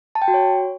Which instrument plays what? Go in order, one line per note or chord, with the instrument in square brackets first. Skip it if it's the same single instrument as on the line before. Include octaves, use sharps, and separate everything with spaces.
[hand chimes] A5
G5
F#4
C#5